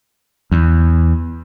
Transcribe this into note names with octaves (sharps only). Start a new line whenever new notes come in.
E2